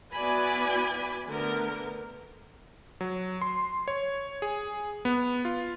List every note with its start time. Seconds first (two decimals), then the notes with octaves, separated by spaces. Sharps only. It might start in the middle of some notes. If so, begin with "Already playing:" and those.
0.14 B3 E4 F#4 D5 G#5 B5
1.29 D3 A3 B3 A#4
3.01 F#3
3.42 C6
3.88 C#5
4.42 G#4
5.05 B3
5.45 F4